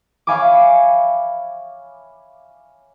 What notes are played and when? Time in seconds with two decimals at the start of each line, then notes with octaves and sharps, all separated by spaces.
0.27 C#5 E5 F5 G#5 B5 D6